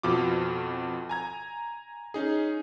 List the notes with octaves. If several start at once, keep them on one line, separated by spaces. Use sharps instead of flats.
F2 B2 F4 D6
G#5 A#5 G#6
C#4 D#4 G#4